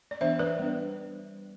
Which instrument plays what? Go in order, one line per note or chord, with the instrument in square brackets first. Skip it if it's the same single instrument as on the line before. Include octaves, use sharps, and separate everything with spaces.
[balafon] D5
E3 B3 D4 C5 E5
B4 D5
G3 B3 D4